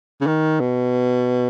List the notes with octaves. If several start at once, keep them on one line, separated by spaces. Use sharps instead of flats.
C#3
D#3
B2